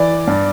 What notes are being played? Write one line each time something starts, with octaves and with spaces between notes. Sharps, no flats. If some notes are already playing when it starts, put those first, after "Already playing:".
Already playing: E3 D5
G2